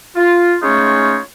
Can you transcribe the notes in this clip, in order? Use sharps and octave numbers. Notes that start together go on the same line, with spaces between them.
F4
G#3 A3 C#4 D#4 F4 C#5